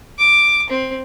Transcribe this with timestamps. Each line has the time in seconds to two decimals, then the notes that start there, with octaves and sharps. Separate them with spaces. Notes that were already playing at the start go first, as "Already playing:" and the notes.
0.19 D6
0.70 C4